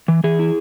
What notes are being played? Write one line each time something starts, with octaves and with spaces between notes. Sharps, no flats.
E3
E3 G#4
E4